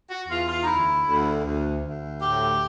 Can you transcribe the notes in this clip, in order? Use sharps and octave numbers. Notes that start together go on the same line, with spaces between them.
F#4
E2 F4
F4
D#4
D2 E4
D2
D2
D2
A2 G4